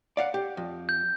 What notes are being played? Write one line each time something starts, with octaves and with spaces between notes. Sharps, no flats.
D5 F5 F#5
G4
F2
G6